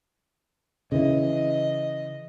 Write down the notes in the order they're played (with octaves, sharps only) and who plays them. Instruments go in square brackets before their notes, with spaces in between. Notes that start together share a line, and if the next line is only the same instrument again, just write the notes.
[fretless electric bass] C#3 E3 [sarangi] D#5